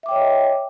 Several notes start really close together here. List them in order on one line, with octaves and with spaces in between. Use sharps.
E5 D6 G5 C#5 D#5